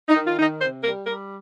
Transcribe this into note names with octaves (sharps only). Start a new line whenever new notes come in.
D#4
D#3
F4
D#3 D#4
C3 C5
G3 A#4
G3 A#4